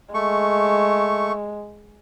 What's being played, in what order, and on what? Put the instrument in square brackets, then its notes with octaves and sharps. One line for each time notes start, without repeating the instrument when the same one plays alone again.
[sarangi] G#3 [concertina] A3 C#6